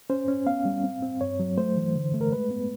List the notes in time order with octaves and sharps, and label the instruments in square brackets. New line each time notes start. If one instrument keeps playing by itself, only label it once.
[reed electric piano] C#4 C5
C#4
B3 F5
G3
C4
C4
G2 C#5
F#3
A3 C5
E3
D3
A3
A#4
G#3 B4
B3